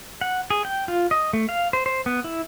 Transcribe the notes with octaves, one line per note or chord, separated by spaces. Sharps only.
F#5
G#4
G5
F4
D#5
A3
F5
C5
C5
B3
E4